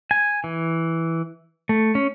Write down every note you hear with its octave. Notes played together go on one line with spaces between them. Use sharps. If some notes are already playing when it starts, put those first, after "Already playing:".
G#5
E3
A3
C#4